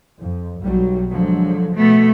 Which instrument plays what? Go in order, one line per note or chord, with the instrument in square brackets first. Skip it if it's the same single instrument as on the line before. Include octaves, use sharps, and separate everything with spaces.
[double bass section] F2
B1 F#3 G3
[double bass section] D3 F3 G#3 [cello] F#3
[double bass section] B2 [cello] A3 B3